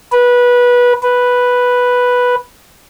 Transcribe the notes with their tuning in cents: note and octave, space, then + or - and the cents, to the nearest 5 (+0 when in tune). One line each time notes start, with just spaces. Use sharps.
B4 -20
B4 -5